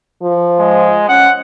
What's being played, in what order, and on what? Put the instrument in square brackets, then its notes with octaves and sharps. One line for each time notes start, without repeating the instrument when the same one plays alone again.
[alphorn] F3
[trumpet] G#3
[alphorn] C#4 [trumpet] F#5